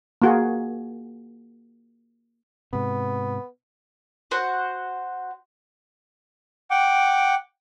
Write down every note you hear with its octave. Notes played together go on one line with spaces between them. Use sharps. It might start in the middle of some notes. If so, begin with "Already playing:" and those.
A#3 F#4 G#4
G#2 C3 B3
F#4 C5 F#5
F#5 G5 D6